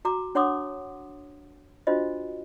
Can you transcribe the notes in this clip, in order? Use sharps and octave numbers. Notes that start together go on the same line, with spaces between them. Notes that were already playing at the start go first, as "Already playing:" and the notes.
F#4 A#5 D6
D4 C#5 F#5 C6 D6 D#6
D4 F4 F#4 C5 D#5